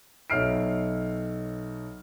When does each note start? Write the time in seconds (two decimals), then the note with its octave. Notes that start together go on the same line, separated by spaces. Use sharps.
0.30 B1 C#5 E5 F6 C7 D7